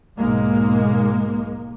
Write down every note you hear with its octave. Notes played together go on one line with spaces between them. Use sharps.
B1 G#2 G#3 A#3